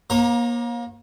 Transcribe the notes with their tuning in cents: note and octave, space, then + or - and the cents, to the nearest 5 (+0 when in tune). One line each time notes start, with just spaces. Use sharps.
A#3 +30 C#5 -40 A#5 +0